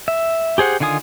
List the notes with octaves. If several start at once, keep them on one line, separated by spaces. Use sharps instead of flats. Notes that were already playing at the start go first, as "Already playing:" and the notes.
E5
G4 G#4 C5 F#5
D3 D#3 F4 G#5 D#6